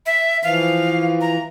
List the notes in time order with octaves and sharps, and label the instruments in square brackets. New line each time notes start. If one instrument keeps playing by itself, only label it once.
[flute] E5
[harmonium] E3 F3 [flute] F5
[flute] A#5